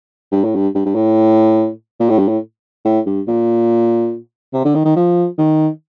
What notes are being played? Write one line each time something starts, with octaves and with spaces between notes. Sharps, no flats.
G2
A2
G2
G2
G2
A2
A#2
A2
G2
A2
A2
G2
A#2
C3
D3
D#3
D#3
F3
D#3